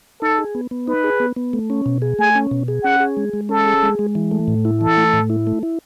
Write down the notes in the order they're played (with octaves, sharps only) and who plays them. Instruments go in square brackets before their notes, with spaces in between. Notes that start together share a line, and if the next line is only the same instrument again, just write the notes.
[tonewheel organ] D#4 [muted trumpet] A4
[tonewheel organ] G#4
B3
B3
[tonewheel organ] D#4 [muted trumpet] B4
[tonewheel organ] G#4
B3
B3
A3
C#4
B2
G#4
[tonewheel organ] A3 [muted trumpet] G#5
[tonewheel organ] C#4
B2
G#4
[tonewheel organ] C#4 [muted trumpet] F#5
[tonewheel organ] G#4
G#3
G#3
[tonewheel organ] C#4 [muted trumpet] A4
[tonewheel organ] G#4
G#3
G#3
E3
A3
A2
E4
[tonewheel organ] E3 [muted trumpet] A4
[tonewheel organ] A3
A2
E4
A3
E4